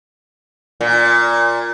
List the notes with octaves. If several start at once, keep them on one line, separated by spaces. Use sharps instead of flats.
A#2